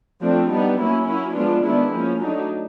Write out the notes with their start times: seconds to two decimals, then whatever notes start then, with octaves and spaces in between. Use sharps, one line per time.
0.21 F3 A3 C4 D4
0.49 G3 B3 D4 D#4
0.78 F#3 A#3 C#4 E4
1.06 F#3 A#3 C#4 E4
1.35 F3 G#3 B3 D4 F4
1.63 D#3 G#3 B3 D4 E4
1.92 F3 A#3 C#4
2.20 F#3 A3 D4 D#4